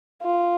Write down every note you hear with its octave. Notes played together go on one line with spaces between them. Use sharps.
F4